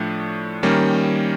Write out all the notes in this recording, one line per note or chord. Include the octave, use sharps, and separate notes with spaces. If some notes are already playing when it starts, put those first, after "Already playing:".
Already playing: A2 F3 A3 D4
D#3 G3 A#3 C#4